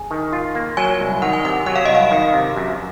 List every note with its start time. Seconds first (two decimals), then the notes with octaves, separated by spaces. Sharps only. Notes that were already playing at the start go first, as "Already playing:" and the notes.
Already playing: G#4
0.11 D#3
0.33 F4
0.55 A#3
0.77 F#3 G#5
1.00 C2
1.22 D#3 F#5
1.33 G#5
1.44 C3 F#5
1.66 F#3 F#5
1.76 F5
1.85 C2 D#5
1.95 F5
2.11 D#3
2.34 C3
2.56 F#2